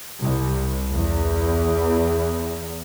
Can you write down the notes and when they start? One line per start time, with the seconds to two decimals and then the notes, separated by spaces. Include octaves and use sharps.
0.20 C2
0.92 E2